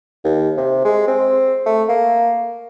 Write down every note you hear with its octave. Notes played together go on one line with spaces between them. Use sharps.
D#2
C3
G#3
C4
A3
A#3